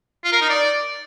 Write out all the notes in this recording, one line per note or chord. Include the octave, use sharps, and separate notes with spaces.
F4
A#4
D#4
D5